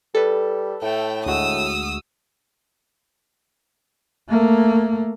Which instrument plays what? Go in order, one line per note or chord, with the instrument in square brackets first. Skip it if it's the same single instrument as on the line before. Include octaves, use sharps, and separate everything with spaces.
[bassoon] G3 [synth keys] A4 B4
[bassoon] A2 [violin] A3 G5
[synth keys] D2 G#3 F#4 [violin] D#6 E6
[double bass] A3 A#3